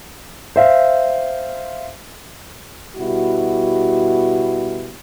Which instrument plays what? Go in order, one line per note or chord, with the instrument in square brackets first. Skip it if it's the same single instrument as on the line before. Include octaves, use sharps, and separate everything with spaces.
[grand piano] C5 E5 F5
[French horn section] B2 G3 E4 F#4